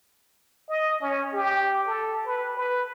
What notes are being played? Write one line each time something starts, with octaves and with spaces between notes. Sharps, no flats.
D#5
C#4
G4
A4
B4
B4